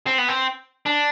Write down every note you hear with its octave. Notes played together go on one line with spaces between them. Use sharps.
C4
B3
C4
D4